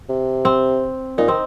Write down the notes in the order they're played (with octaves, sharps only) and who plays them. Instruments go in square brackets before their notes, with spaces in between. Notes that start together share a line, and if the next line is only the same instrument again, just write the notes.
[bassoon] C3
[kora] C4
[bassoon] A#2 [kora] D#4
[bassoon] D#3 [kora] C4